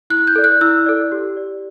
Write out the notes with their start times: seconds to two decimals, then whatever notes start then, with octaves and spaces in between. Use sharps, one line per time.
0.10 E4 F#6
0.27 G6
0.36 A4 D5
0.44 F#6
0.61 E4 E6
0.86 A4 D5
1.12 G4
1.37 D5